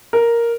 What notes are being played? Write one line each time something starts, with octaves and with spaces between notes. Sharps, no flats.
A#4